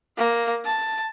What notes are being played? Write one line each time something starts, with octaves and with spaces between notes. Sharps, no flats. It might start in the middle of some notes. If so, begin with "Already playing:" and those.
A#3
A5